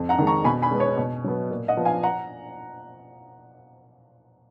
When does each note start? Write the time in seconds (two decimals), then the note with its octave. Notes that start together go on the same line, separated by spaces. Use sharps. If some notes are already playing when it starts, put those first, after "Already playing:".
Already playing: F2
0.09 F#5 A#5
0.18 D#3 G#3
0.27 A#5 C#6
0.44 B2 G#5 B5
0.62 G#5 B5
0.71 G#3 B3
0.80 C#5
0.97 B2
1.24 F#3 B3
1.50 A#2
1.68 D#5 F#5
1.77 F3 B3
1.85 F5 G#5
2.03 F#5 A#5